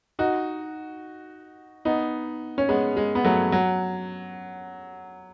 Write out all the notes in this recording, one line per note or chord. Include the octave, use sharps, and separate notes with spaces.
D#4 F#4
B3 D#4
C#4
G#3 B3
G#3
B3
F#3 A3
F#3